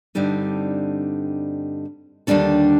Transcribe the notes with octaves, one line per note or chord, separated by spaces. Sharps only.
G2 D3 G3 C4 D#4
D#2 D3 G3 D4 A4